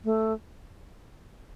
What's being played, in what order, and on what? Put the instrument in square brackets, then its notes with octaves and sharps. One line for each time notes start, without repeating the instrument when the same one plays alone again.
[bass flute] A3